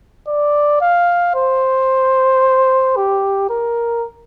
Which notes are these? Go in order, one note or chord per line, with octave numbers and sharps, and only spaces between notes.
D5
F5
C5
G4
A#4